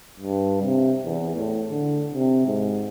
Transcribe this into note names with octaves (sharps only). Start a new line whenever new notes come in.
G2
C3
E2
A2
D3
C3
G#2